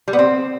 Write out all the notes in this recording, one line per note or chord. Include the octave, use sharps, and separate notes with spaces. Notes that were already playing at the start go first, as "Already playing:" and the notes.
G3
B3
C4